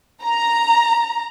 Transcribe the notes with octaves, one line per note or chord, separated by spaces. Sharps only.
A#5